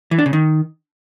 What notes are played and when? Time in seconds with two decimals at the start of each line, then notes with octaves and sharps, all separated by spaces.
0.11 E3
0.19 D4
0.26 C#3
0.33 D#3